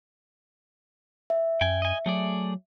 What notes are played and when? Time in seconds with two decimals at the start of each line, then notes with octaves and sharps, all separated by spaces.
1.30 E5
1.61 F#2 G5 G#5
1.82 D#5 G#5
2.06 F#3 A3 G#4 D5